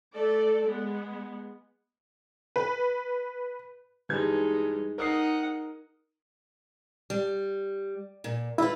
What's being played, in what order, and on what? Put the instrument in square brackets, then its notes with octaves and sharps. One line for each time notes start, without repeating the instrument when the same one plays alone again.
[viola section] A3 A4 D5
G#3 B3
[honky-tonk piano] B4
[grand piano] G2 E3 G#6 [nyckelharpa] G#3 D#4
[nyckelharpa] D#4 F#5 [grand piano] A#4 D#6 C7
[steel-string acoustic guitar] G3
A#2
[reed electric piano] E4 [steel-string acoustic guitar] F4 B4